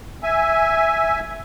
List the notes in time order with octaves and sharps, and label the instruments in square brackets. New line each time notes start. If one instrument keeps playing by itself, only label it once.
[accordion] E5 G#5